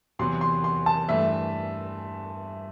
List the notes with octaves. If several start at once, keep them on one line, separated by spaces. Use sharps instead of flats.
E2 C3 F#3 B3 C6
C6
C6
A5
G2 E3 A3 E5